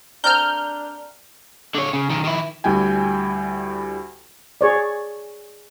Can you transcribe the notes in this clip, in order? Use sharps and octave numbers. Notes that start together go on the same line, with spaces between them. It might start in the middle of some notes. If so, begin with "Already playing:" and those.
A3 C4 D4 A#4 F6 G6
D3 C#5
C#3
B1 D#3
D#3 E4
D2 G3 E4 G5 G#5
G#4 C#5 D5